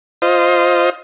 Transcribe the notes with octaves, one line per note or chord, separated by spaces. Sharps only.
F4 C5 D#5